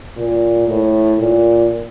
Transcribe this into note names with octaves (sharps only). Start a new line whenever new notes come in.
A#2
A2
A#2